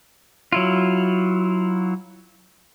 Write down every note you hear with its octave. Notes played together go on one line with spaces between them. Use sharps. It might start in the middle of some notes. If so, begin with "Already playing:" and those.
F#3 E4 F4